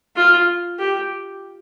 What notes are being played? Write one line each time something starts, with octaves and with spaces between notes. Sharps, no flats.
F4
G4